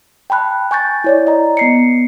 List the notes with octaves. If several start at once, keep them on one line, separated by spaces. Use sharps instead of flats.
G5 A5 B5 F#6
G#5 C#6 G6 A6
E4 C#5 D5
D#5 A#5
B3 C7 C#7